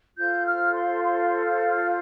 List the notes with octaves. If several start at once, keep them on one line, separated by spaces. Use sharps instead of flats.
F4 A4 C5 G6
F6
C6
C6
F6
G6
F6